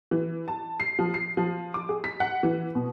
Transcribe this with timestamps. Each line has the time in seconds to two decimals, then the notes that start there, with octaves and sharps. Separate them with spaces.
0.11 E3
0.48 A5
0.80 C7
0.99 F3
1.14 C7
1.37 F3
1.74 D6
1.89 G#4
2.04 B6
2.20 F#5
2.43 E3
2.75 B2